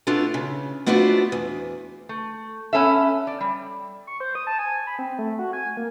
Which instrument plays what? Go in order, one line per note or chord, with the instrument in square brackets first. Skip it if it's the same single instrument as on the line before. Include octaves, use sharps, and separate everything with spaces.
[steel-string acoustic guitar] A3 B3 D4 E4 F4 A4
C#3
A3 B3 D4 F4 F#4 C5
E2
[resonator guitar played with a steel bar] A3
B3 C#4 A4 E5
D5
G3
[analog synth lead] C#6
C5
D#6
A5
G#5
B5
C4
A3
F#4
G#5
A#3